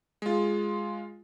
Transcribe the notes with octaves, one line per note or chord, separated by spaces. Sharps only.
G#3 F4